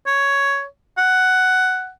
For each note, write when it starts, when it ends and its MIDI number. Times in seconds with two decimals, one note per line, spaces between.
0.07 0.64 73
0.98 1.90 78